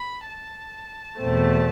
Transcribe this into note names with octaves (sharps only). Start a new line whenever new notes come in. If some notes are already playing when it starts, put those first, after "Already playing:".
Already playing: B5
A5
E2 B2 A3 C4